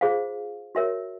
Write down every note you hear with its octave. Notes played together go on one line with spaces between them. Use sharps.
F4 G#4 C5 F5
F#4 A#4 C#5 E5